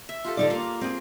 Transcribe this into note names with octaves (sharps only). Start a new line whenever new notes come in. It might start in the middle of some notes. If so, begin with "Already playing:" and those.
E5
F4 G4 A4
D3 D#4 D5
A#3 F4 A#4
C4 G#4 A#4